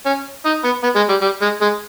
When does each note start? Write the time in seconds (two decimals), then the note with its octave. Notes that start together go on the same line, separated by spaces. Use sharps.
0.06 C#4
0.45 D#4
0.64 B3
0.84 B3
0.96 G#3
1.09 G3
1.22 G3
1.42 G#3
1.61 G#3